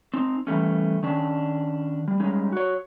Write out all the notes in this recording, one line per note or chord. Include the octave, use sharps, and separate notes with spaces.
C4 D#4
E3 G3 A3 C#4
D#3 C#4 D4
G3
G3 G#3 C#4 D#4
F#4 C#5